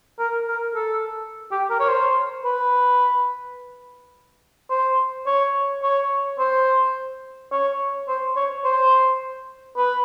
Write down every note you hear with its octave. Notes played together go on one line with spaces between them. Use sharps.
A#4
A#4
A4
G4
A#4
C#5
C5
B4
C5
C#5
C#5
C5
C#5
C5
C#5
C5
B4